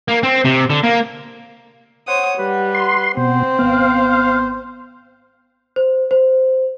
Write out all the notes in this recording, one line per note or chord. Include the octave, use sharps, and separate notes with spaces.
A#3
C4
C3
D3
A#3
C5 C#5 F#5 D#6
G3 B4
C6
B2 C4 C5
G#1 B3 F5
C5
C5